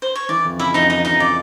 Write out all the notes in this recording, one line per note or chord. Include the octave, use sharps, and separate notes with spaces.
C5
C#5
E3 D5
F2
C#3 E4 E5
F2 D#4 D#5
E3 D#4 D#5
F2 D#4 D#5
C#3 D5